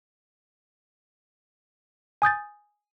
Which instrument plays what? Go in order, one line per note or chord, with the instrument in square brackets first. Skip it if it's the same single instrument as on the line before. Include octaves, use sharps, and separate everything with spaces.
[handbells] G#5 D#6 G6 A6